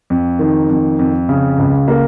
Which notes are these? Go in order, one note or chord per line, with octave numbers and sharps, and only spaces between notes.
F2
D#3
F2
F2
C#3
C#2
A#3